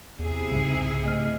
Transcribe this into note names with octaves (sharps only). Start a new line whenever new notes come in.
E2 C3 E4 G#4
C2 G#2 C#3
A3 D#5 F6